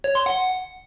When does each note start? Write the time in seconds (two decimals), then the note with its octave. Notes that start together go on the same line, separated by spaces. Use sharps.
0.04 C#5
0.15 C6
0.26 F#5